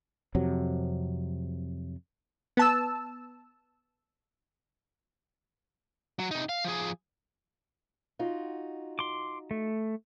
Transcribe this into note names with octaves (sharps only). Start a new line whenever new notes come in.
F2 C3 F#3
B3 A5 E6
F#3
C3 D#4
F5
F3 G#4
D#4 F4 F#4
C6 D6
A3